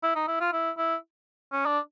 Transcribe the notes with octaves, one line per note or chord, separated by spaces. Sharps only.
E4
D#4
E4
F4
E4
E4
C#4
D4